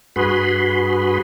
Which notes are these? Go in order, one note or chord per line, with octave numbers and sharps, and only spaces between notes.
G2 F#4 G#4 B4 B5 C6